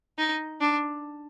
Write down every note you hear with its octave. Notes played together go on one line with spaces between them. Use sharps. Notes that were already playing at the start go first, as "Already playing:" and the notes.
D#4
D4